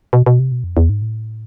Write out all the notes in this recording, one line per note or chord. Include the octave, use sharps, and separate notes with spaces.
B2
B2
C3
B2
F2
E2
G#2
A2